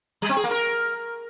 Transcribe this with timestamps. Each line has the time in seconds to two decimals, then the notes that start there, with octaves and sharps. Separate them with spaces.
0.22 G3
0.29 C4
0.36 G#4
0.44 A#3
0.51 A#4